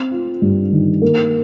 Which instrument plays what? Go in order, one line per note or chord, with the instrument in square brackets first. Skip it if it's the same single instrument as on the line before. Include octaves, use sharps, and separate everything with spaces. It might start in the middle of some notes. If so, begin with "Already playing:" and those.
Already playing: [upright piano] C4
F4
G2
D#3
A#3